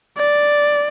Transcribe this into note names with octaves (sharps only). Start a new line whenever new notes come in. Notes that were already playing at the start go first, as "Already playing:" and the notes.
D5